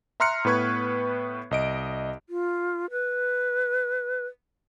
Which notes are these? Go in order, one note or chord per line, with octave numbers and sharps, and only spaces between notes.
E5 A#5 C6 F6 F#6 C#7
A2 B3 B4 C#6 G#6
C2 D#5 D7
F4
B4